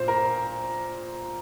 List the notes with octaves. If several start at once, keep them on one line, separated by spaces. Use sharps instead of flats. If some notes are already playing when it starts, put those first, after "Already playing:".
Already playing: A#2 C5
A#4